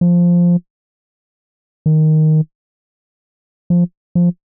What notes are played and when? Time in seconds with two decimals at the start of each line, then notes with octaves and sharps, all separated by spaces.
0.01 F3
1.86 D#3
3.70 F3
4.15 F3